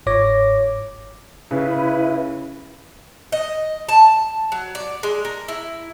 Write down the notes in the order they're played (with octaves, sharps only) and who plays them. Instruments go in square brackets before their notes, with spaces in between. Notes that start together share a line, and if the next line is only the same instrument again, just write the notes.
[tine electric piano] G1 G#2 C#5 D6 A#6
[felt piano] C#3 [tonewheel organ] E4 B4
[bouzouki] D#5
A5
F#3
D5
G#3
A#4
E4